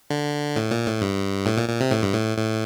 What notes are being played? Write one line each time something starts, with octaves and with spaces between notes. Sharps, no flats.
D3
A2
A#2
A2
G2
A2
A#2
A#2
C3
A2
G2
A2
A2